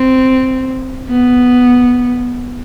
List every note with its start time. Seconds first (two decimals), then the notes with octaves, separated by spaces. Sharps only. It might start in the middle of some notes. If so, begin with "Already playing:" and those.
Already playing: C4
1.09 B3